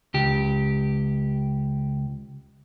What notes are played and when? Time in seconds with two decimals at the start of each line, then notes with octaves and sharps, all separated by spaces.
0.14 C#2 G4